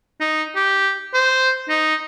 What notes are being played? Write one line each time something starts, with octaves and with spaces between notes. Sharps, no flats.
D#4
G4
C5
D#4